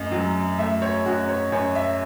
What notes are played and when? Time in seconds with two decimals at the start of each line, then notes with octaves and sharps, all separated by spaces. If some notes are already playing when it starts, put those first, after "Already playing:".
Already playing: F#2 A3 D#5
0.12 F#3
0.58 A3 E5
0.82 C#5
1.06 F#2 F#4
1.29 C#5
1.52 F#2 C#5
1.75 E5